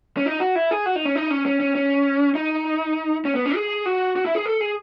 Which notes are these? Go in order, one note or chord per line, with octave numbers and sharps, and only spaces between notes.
C#4
D#4
F#4
E4
G#4
F#4
D#4
C#4
D#4
C#4
C#4
C#4
C#4
D#4
C#4
B3
C#4
G#4
F#4
F#4
E4
G#4
A4
G#4